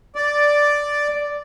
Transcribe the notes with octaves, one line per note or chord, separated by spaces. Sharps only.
D5